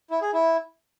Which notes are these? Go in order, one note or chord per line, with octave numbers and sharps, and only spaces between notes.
E4
G#4
E4